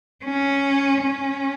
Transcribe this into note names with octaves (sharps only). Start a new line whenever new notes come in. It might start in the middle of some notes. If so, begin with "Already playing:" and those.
C#4
C#4